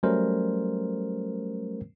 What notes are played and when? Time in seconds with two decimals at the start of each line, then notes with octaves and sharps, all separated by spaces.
0.03 F#3 G3 A3 C#4 A#4 C5